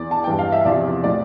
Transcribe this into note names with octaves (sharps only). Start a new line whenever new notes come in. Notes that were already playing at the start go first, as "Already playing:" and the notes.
Already playing: E2 D5
A5
G2 E3 G5
F5
E5
E2 C3 F3 D5
A2 F3 D5